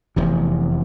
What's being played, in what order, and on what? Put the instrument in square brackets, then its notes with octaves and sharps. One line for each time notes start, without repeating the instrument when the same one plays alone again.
[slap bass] F1 E2 C3 E3